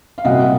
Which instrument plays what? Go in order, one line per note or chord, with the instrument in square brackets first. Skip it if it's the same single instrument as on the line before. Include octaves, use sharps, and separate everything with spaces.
[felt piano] F5
C2 A#2 F#3 D#5 F#5